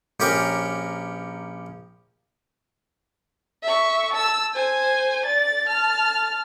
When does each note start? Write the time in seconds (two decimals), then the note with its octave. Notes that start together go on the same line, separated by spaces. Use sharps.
0.20 A#1 C#4 G4 A#4 A#5
3.63 E5 C#6
4.13 A5 E6
4.54 C5 G#5
5.26 D5 A6
5.67 A5 F6